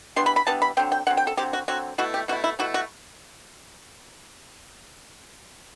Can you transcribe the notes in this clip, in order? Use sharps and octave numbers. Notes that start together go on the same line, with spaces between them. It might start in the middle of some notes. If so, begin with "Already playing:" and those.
E3 G3 B3 D4 C6
B5
B5
E3 G3 B3 D4 A5
B5
D3 F#3 C4 G5
G5
D3 F#3 C4 F#5
G5
A4
D3 F#3 C4 G4
F#4
D3 F#3 C4 F#4
B2 A3 E4 F#4
G4
B2 A3 E4 F#4
E4
B2 A3 E4 F#4
F#4